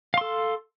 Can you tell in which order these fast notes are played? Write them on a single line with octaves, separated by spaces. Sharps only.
F5 C6 A4